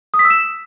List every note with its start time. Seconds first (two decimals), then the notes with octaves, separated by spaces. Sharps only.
0.14 D#6
0.19 B6
0.25 E6
0.30 E7